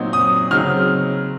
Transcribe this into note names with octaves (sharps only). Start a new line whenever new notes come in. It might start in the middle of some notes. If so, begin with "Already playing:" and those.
Already playing: A#2 F#3 C4 D#4
D#6
C#3 F#3 C4 D#4 F6